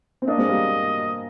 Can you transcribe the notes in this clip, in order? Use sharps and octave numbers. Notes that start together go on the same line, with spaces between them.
C4
A#3 D4 D#5
G#3 C4
G3 A#3